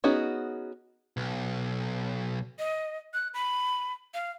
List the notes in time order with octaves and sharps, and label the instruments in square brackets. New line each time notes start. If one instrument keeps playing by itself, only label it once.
[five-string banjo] B3 C#4 D#4 F#4 G#4
[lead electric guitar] B1
[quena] D#5
F#6
B5
F5